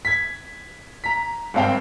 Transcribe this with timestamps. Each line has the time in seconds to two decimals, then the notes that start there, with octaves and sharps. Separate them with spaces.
0.05 G#6 B6
1.04 A#5 B6
1.54 G#1 G2 C4 F5 G5